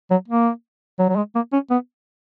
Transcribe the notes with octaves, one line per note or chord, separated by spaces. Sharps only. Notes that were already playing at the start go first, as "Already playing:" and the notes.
F#3
A#3
F#3
F#3
G#3
A#3
C#4
B3